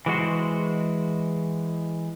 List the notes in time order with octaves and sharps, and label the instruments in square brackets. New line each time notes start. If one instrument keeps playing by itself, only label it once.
[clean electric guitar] E3 G#3 F#4 C5